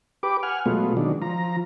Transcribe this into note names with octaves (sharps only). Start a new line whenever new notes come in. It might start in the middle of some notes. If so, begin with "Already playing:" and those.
G4 B4 D6
F#5 G#5 F6
B2 F#3 G#3 A3 B3 F4
D#3 F#3 G#3 D4
F3 A#5